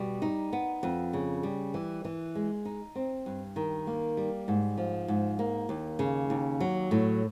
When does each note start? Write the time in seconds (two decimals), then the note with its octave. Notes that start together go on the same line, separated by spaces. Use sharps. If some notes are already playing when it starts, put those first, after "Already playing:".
Already playing: B2 G3
0.22 D#4
0.53 B3
0.83 F2
1.13 C#3
1.43 G3
1.74 E3
2.05 E3
2.35 G#3
2.65 D#4
2.95 C4
3.26 G2
3.56 D#3
3.87 A#3
4.17 G3
4.48 G#2
4.77 F3
5.08 G#2
5.39 A#3
5.69 D#2
5.99 C#3
6.30 D#2
6.60 F#3
6.91 A2